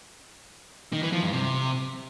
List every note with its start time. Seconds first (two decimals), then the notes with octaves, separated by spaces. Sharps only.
0.93 D#3
1.03 E3
1.13 F3
1.23 G2
1.33 C3